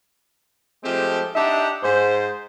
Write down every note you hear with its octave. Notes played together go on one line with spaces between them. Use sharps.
F3 G#3 A3 C4 G4
D4 D#4 G4 E5 F#5
G#2 C5